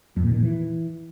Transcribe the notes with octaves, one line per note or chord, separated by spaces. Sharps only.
F2
A#2
D#3
A#2
E3